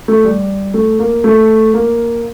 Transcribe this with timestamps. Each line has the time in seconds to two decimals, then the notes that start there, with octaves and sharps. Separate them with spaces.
0.08 A3
0.25 G3
0.74 A3
0.99 A#3
1.24 A3
1.74 A#3